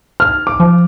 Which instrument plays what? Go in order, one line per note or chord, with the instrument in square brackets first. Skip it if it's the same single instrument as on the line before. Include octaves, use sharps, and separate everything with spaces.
[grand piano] F6
D6
[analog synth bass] F3